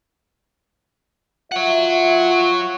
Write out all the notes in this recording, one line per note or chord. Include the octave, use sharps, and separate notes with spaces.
F4 C#5 E5 F#5